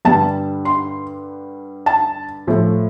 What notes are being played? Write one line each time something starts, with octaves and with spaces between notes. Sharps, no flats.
G2 D3 G3 A5
C6
A5
A2 F3 A3